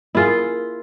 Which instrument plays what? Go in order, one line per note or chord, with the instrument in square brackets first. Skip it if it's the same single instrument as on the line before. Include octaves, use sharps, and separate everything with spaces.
[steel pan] A#3 G#4 [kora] E4 F4